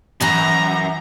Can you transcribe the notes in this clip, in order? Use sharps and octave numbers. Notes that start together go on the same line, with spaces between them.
F#2 E3 E4 E5 A#5